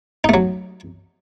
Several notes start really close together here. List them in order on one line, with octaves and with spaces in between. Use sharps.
D#4 A3 F#3